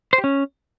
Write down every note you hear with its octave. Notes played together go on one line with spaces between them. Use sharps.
C5
G4
C#4